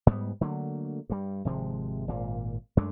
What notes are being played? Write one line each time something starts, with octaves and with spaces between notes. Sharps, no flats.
G#2 G3 G#3 B3
D3 F#3 A3 A#3
G2 G3
G#1 C3 F3 G#3
G#1 A#2 A#3
F#2 G#3 A3 D4